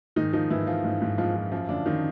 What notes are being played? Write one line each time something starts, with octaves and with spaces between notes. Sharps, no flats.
G#2 D#3 D#4
D#3 F3 D#4
G#2 E3 E4
F3 F4
G#2
G#2
G#2 F3 F4
F3
F#2 F3 F4
F#2 D3 D4
F#2 D#3 D#4